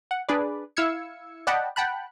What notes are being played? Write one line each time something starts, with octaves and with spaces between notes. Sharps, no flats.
F#5
D4 G#4 B4 D5
E4 F5 E6 G#6 C#7
D5 D#5 F#5 G5 A5 B5
F#5 G5 A5 B5 F#6